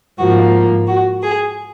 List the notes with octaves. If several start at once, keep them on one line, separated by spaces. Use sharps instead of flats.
G#2 F3 A#3 F#4
F#4
G#4